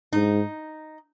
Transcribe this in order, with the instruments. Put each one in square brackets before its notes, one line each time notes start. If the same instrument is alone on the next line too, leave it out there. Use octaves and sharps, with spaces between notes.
[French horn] G#2 [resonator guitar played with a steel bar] D#4